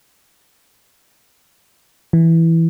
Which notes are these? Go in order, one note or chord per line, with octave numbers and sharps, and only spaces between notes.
E3